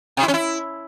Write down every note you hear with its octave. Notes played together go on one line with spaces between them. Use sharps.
C3
E4
C#4
E4